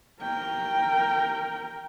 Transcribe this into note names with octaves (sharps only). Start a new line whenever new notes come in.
A#4 G5